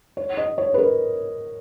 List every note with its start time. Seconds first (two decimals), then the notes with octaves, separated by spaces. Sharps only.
0.17 C#5
0.37 D#5
0.58 C#5
0.74 B4
0.78 A#4